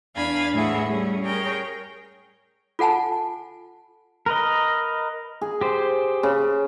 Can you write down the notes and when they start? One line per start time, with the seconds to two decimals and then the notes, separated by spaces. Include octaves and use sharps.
0.15 E2 D4 F5 G#5 B5 A6
0.53 A2 E3 A3 G#4 E5 F#5
0.87 G3 A3 C#4 G#4
1.24 G#4 A#4 C#5 G5
2.79 F4 A4 F#5 G#5 A5
4.26 A#4 B4 D#5
5.41 G#4
5.61 G4 C5
6.23 C#3